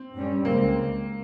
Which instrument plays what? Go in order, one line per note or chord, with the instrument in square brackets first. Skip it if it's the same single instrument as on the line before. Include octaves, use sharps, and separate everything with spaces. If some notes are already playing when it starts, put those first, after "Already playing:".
Already playing: [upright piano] C4
[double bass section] G2 G3 C#4
[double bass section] C#2 C#3 G#3 C4 [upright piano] A#3